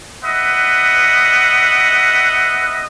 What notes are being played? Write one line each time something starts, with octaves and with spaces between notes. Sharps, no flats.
B4 D#5 E5 F#5